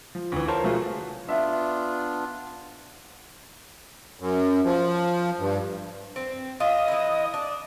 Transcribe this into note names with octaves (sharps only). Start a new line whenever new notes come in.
F3
D2 E3
F4 A#4 C5 C#5 A5
B2 F3 A3 F4 F#4 G#4
B3 D4 F4 E5
F#2
F3
G2
C4
F4 D#5
E3 E4
D4